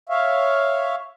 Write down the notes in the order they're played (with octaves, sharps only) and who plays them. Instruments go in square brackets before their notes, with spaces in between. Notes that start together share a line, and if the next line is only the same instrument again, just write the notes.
[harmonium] C#5 E5 F5